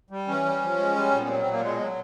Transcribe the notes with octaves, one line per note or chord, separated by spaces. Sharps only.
G3
E3 C#4
G3
F3
G#3
G3
A#2
B3
F#3 C4
C4
A#2
A#3
B2 G#3
F#3